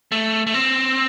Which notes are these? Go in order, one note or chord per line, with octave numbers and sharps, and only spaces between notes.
A3
A3
C4